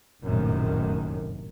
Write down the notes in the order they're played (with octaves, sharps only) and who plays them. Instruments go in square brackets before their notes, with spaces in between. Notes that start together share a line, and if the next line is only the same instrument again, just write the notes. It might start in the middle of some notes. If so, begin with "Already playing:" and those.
[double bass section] F1 A#1 F#2 A2 C3 D#3